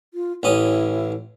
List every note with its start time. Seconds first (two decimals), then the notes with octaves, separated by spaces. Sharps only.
0.14 F4
0.43 A1 C#4 E4 D#6